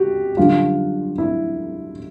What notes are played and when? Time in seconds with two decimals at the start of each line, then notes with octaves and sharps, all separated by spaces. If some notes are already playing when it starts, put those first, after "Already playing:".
Already playing: F#4 G4
0.37 F#2 D3 G3 F4
1.18 E4